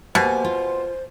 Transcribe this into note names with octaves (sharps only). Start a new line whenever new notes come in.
B2 A#3 G4 C5 G#5
F4